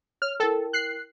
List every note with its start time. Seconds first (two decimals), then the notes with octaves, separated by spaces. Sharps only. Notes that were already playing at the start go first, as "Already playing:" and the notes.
0.22 C#5 F6
0.40 E4 A4 A#4 G5
0.73 F#6 C7